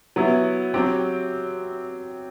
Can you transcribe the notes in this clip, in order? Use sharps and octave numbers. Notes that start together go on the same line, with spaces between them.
F#3 B3 E4
F#3 C4 G4